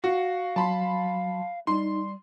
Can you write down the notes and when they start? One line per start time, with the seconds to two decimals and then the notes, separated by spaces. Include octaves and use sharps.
0.04 F#4 F5
0.56 F#3 A5 B5 C6
1.67 G3 D#4 C6